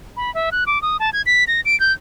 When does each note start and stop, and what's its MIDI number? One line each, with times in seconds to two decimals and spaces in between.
0.17 0.33 83
0.35 0.50 76
0.52 0.64 90
0.66 0.81 86
0.82 0.97 87
1.00 1.10 81
1.13 1.22 92
1.26 1.44 95
1.47 1.61 94
1.65 1.78 98
1.80 1.93 91